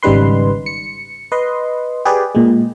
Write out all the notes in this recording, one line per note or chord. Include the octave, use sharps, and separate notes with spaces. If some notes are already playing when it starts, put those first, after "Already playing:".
G#1 C#3 G3 D#4 B4 C6
C#7
B4 D#5 C6
G4 G#4 B4 D5
A#2 G#3